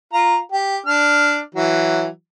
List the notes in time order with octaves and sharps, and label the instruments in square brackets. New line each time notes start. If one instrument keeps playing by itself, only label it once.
[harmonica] F4 A#5
G4
D4 F6
E3 F#3